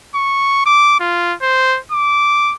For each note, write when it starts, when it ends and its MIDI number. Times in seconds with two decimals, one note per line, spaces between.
0.15 0.65 85
0.66 0.99 86
1.00 1.34 65
1.42 1.78 72
1.92 2.54 86